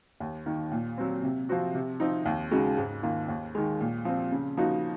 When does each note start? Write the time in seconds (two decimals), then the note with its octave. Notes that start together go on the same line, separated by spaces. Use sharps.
0.20 D#2
0.46 D#3 A#3
0.72 A#2
0.98 F#3 C4
1.23 C3
1.49 F3 C4 F#4
1.75 C3
2.00 F3 C4 D#4
2.26 D#2
2.51 C#3 G#3 D#4 F#4
2.78 G#2
3.03 D#3 A#3 F4
3.28 D#2
3.55 D#3 G#3
3.81 A#2
4.05 F3 C4
4.32 C#3
4.57 F3 A#3 D#4 F#4